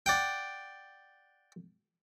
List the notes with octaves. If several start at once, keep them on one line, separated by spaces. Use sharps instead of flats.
D5 F#5 G5